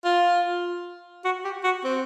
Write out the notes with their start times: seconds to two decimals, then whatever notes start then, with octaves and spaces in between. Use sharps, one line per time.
0.05 F4
1.25 F#4
1.45 G4
1.64 F#4
1.84 C4